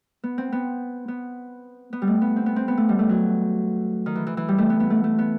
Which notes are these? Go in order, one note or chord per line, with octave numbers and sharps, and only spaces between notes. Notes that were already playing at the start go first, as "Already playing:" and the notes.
B3
C4
B3
B3
B3
G3
A3
B3
C4
B3
C4
B3
A3
G3
A3
F#3
D#3
E3
E3
E3
G3
A3
B3
B3
A3
A3
B3